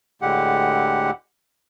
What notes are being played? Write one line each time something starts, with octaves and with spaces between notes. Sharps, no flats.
D2 A2 D3 G#3 G4 F#5